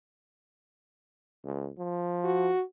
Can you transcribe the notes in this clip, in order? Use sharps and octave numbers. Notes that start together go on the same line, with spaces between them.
C#2
F3
F#4